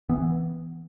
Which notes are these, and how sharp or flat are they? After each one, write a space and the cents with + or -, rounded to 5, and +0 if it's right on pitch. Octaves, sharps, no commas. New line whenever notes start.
E3 +0 B3 +0